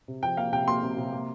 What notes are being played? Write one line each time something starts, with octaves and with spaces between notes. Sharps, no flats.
C3
F3 G5
A#3 F5
C3 G5
A#3 C6
C3
C3
A#3